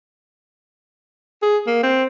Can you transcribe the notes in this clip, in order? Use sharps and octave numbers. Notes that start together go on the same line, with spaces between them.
G#4
A#3
C4